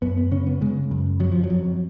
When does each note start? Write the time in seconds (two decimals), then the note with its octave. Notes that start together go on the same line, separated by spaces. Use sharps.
0.02 F#2 B3
0.17 B3
0.31 C#3 C#4
0.47 B3
0.61 C#3 G#3
0.91 F#2
1.20 F2 F#3
1.32 F3
1.44 F#3
1.50 F2